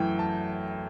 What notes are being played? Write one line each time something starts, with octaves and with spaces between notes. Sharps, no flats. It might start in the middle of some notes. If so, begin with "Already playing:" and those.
Already playing: F#2 E3 A3 G5
A5